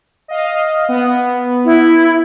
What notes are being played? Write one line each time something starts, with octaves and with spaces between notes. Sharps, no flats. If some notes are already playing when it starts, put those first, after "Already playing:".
D#5 F5
B3
E4